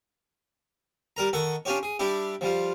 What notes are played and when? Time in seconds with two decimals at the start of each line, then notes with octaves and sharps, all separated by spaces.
1.17 G3 A#4 A#5
1.33 D#3 A4 F#5 C#6
1.65 C#4 D4 F4 G4 C#5
1.83 G#4
1.99 G3 D4 E4 G4
2.41 F3 G3 F4